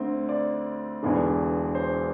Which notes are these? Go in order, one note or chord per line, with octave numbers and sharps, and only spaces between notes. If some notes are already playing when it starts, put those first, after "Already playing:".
Already playing: D2 D3 C4
D5
E1 E2 D3
C5